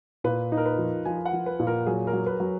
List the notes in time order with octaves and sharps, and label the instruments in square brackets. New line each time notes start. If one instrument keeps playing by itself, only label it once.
[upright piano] A#2 [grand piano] B4
[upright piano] D#4
[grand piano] A#4
B4
[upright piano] F3
[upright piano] F3 [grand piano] G#5
[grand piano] F#5
[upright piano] F3
[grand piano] B4
[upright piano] A#2
[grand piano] A#4
[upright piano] F#3 [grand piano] G#4
[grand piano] A#4
[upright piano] F#3
[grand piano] B4
[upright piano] F#3